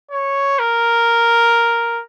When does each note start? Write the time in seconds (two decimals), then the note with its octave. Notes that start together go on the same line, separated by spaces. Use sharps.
0.11 C#5
0.59 A#4